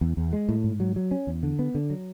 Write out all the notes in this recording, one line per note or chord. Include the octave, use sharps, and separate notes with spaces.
E2
E2
G#3
A2
G#2
F#3
F#3
C#4
E2
D3
B3
D3
F#3